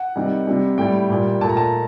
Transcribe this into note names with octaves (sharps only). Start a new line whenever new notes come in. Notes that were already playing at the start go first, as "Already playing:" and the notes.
Already playing: F#5
C3 D#3 G3
C3 G3
A2 G3 G5
A#2 G3
A#2 A3 A5
A#5
A5